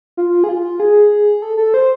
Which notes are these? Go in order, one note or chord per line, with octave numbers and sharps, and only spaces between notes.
F4
G#4
F4
G#4
A4
A4
C5